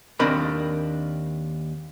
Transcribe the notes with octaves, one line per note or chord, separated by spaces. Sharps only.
D#2 C4 D4 A#4 D#5 B5